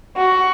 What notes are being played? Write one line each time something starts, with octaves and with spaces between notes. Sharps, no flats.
F#4